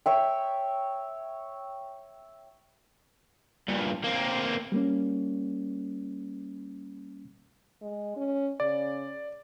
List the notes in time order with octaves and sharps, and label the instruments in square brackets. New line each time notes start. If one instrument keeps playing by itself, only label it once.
[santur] C#5 E5 G5
[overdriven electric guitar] G2 A#2
A#3 C4
[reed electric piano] G3 A#3 C#4
[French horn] G#3
C#4
[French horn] C#3 [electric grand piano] D5